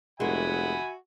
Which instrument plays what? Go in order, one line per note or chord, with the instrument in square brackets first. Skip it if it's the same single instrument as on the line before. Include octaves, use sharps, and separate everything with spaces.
[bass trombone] F1 [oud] G#3 A#3 [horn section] F#4 E5 [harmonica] F#5 G#5 B5